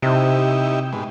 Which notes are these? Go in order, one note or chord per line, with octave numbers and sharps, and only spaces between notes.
C3 D#4 E4 G4
G#2 B2